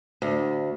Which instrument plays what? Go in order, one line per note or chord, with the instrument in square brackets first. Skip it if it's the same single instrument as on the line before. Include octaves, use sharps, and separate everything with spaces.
[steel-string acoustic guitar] D2